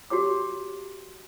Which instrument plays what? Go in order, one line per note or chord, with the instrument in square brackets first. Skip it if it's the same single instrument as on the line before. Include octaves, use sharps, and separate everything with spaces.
[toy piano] F#4 G4 C#5 D6